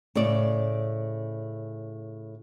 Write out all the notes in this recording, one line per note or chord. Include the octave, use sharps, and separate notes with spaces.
A2 C#3 D5